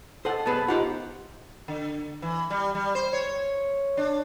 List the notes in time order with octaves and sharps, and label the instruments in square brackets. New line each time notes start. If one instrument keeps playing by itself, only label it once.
[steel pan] A4 A5 [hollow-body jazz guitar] C5 D#5 F#5
[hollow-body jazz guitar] B1 B3 G#4 [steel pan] B4 A5
[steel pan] D#4 F#5 [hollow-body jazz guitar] F4 G4 C5
[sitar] D3
E3
G3
G3
C5
C#5
D4